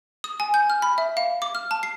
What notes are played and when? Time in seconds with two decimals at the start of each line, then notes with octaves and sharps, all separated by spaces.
0.24 D#6
0.40 G#5
0.54 G6
0.70 F6
0.82 B5
0.98 E5
1.17 F5
1.42 D6
1.55 F6
1.71 A5
1.83 C7